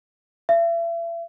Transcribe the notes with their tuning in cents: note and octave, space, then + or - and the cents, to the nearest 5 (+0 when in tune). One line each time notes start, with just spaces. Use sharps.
E5 +40